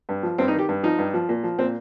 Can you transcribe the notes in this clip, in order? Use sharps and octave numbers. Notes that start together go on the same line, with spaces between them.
G2
F3
G2 C4
D#4
D#3
G4
G2
F3 D#4
G2
F3
A#2
F3
A#2 C4